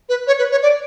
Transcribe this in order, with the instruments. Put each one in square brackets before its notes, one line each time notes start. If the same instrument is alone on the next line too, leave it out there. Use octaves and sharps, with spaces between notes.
[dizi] B4
C#5
B4
C#5
D5